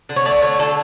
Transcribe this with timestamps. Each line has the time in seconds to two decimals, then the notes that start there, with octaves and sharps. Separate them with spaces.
0.09 D3
0.16 C#5
0.25 A3 D5
0.42 D3 C#5
0.59 D3 A4